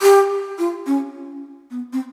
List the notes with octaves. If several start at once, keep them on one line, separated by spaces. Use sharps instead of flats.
G4
F4
C#4
B3
C4